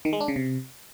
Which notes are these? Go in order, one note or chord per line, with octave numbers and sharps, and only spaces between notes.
D#3
G#3
D4
C#3
C3